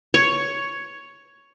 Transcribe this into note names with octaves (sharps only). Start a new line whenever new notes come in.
C#5